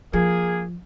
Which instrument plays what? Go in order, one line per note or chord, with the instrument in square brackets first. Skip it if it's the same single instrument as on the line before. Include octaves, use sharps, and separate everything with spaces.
[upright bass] F3 [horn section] A#3 G#4